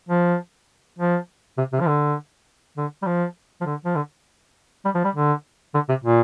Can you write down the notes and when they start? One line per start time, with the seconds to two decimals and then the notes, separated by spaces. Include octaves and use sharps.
0.09 F3
0.98 F3
1.58 C3
1.73 C3
1.80 F3
1.88 D3
2.77 D3
3.02 G3
3.06 F3
3.61 F3
3.66 D3
3.85 F3
3.96 D3
4.85 G3
4.95 F3
5.04 G3
5.15 D3
5.74 D3
5.89 C3
6.04 A#2